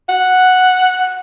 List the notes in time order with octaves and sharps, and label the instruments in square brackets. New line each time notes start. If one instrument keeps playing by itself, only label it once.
[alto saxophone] F#5